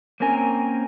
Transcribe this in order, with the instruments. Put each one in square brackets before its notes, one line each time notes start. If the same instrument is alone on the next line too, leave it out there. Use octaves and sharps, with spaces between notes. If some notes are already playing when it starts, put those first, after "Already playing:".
[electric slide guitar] A#3 C4 C#4 A#4 G#5